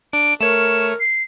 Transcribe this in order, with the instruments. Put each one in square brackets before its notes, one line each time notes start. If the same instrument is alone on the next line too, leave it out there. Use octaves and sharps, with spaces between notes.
[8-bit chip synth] D4 [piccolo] D7
[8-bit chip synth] A3 C#5 [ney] A#4 [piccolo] E7
[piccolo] C7